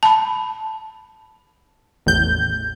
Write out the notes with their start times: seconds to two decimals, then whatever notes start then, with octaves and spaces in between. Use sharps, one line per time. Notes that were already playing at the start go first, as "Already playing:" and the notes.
0.03 A5 B5
2.06 A1 E2 G6